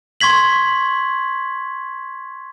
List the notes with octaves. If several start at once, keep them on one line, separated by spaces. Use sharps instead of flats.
C6 C#6 G#6 B6 F#7